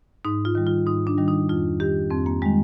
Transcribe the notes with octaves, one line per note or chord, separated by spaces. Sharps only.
G#2 D#4
F4
D#3 G3
F4
G#2 D#4
D4
D#3 G3
D#4
F2 F4
D#3 G3 G4
F2 C4
A#3
D#3 G3 G#3